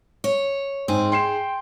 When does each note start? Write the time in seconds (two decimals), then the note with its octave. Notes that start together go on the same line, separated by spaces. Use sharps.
0.24 C#5
0.88 G#2 C4 G#4
1.12 G5 C6 C7 E7